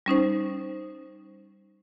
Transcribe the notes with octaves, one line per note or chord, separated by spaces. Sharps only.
G3 C#4 D#4 C5